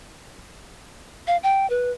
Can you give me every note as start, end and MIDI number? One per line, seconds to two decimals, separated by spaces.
1.27 1.37 77
1.43 1.68 79
1.70 1.91 71